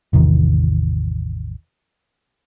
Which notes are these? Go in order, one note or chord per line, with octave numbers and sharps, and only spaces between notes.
A1 E2 C3 D#3